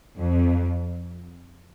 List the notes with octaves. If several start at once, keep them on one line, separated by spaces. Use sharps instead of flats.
F2